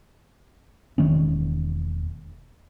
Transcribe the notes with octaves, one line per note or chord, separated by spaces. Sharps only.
E1 D#3 A#3 C#4